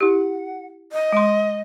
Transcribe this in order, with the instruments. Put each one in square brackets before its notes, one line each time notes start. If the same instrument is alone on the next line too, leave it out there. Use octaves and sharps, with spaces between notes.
[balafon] E4 G4 [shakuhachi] F#5
[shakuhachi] D#5
[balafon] G#3 C6